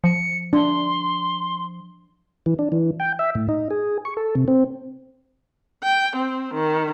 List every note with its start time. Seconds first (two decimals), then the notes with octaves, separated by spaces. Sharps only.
0.04 F3 C#7
0.53 D4 C6
2.46 E3
2.59 D4
2.72 E3
3.00 G5
3.19 E5
3.35 A2
3.49 D#4
3.70 G#4
4.05 C#6
4.17 A4
4.35 C3
4.48 C4
5.82 G5
6.15 C4
6.53 D#3